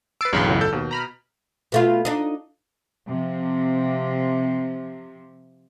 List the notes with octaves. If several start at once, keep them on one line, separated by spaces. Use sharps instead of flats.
B4 E6 A6 C7 D7
B1 E2 G2 C#3 B5 C6
C#2 F#2 A2
A4 G6
D#2 B2
A#5 B5 F6
B2 A3 F4
D4 D#4
C3 F3